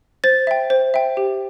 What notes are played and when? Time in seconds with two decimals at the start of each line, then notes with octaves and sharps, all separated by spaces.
0.24 C5 A6
0.47 E5 G5
0.70 C5
0.94 E5 G5
1.17 G4